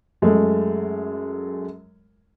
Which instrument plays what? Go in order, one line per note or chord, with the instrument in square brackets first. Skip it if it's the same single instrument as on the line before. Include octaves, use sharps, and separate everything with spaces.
[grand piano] F#2 G#3 A3